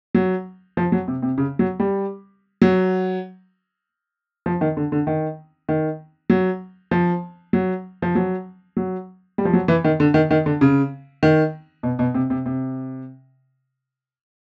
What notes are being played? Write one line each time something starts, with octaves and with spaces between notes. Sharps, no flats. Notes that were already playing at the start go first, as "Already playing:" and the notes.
F#3
F3
F#3
C3
C3
C#3
F#3
G3
F#3
F3
D#3
D3
D3
D#3
D#3
F#3
F3
F#3
F3
F#3
F#3
G3
F3
F#3
E3
D#3
D3
D#3
D#3
D3
C#3
D#3
B2
B2
C3
C3
C3